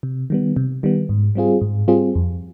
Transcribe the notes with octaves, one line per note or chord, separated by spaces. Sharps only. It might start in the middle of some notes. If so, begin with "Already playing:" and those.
C3
D#3 G3 B3
C3
D#3 G3 B3
G#2
G3 C4 F4 G#4
G#2
G3 C4 F4 G#4
F2